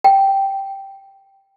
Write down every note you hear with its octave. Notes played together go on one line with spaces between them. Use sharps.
G5